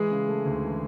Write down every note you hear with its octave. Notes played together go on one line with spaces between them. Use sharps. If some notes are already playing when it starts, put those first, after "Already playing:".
Already playing: E3 G#3 G#4
C#3
A3
D2
E3